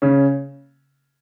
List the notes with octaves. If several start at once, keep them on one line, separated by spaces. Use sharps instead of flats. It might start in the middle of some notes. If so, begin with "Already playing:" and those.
C#3 C#4